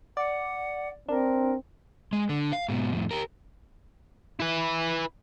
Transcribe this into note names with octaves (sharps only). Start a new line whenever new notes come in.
D5 F#5
C4 D4 A#4
G#3
D3
F5
G#2 B2
F2 A2
G4 A#4
E4 B4